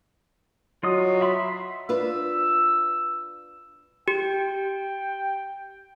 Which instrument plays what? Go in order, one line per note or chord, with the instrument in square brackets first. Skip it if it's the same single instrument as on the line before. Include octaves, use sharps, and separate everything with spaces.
[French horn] F#3 [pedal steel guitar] F4 D#5 D#6
[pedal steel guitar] E5 B5 C6
[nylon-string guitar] D4 F4 B4 [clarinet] E6
[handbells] G4 [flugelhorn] G5